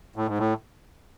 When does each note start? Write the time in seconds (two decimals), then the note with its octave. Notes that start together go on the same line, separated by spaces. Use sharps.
0.16 A2
0.27 G#2
0.38 A2